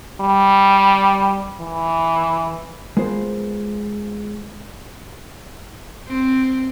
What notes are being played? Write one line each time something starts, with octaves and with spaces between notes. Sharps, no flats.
G3
E3
G#3 B3 F4 A#4 C5
C4